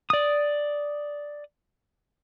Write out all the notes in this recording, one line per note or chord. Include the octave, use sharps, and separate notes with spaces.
D5 D#6